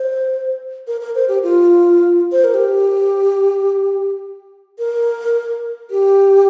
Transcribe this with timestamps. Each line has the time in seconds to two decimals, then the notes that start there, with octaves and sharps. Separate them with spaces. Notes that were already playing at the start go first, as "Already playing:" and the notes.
Already playing: C5
0.87 A#4
1.01 A#4
1.15 C5
1.28 G4
1.43 F4
2.32 C5
2.44 A#4
2.54 G4
4.79 A#4
5.91 G4